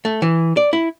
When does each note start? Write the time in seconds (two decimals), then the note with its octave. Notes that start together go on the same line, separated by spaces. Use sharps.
0.05 A3
0.22 E3
0.57 D5
0.73 E4